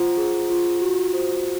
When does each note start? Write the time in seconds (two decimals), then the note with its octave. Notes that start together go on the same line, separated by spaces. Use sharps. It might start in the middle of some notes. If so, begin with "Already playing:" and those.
Already playing: F4 C5 F#5 A#5
0.17 G#4
0.50 F4
0.80 F#4
1.13 C5